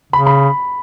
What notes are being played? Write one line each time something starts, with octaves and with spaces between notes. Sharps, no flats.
C#3 B5
B5